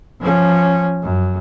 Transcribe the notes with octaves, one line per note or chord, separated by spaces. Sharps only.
F3 C#4
F#2